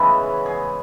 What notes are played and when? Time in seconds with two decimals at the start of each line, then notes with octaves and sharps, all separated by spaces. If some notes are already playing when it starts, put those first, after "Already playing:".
Already playing: C#3 E3 G#3 B3 G#4 B4 C#5 E5
0.46 G#4